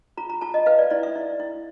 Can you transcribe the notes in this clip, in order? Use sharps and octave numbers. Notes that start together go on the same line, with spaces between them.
F4 A#5
A#5
F4 A5
D#5
B4 F5
D5
E4 D5
E5
E4
E4